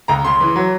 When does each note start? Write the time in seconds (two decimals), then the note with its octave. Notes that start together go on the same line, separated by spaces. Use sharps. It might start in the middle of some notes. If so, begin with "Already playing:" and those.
0.08 C#2 A#5
0.25 C#3 C6
0.40 E3
0.56 F#3